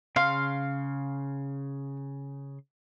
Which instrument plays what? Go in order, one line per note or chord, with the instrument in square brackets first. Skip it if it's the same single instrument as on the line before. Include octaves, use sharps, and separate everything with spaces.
[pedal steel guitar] C#3 C6 [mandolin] F5